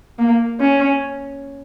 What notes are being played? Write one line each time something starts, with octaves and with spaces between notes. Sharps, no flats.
A#3
C#4